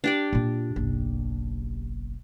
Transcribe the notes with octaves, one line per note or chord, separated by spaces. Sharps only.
D4 G4 D5
A#2 F4
F#1 B1